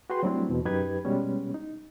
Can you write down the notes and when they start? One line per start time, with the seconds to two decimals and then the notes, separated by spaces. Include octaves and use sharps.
0.10 F#4 G#4 B4 G5 C6
0.23 F#3 G3 A3 C4 D4 E4
0.49 E2 B2
0.65 F#2 D#4 G4 B4 G#6
1.05 B2 G3 G#3 B3 C#4
1.54 D#4